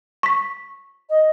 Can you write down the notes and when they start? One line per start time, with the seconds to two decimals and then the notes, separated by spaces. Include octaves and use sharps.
0.23 C#6 B6
1.10 D#5